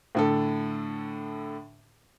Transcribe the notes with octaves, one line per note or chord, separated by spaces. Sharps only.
A2 D3 A4